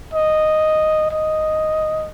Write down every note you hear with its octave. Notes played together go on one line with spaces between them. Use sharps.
D#5
D#5